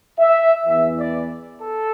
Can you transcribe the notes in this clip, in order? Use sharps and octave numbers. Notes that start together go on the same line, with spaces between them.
E5
E2 E3 E5
D5
A4